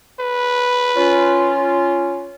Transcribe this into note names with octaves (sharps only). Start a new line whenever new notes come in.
B4
C#4 F4